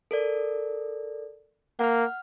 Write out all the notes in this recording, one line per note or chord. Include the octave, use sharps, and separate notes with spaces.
A4 A#4 D5
A#3 F#5 F6